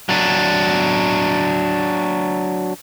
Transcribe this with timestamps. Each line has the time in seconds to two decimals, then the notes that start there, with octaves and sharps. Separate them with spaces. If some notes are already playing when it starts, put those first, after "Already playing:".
0.09 F#3 D4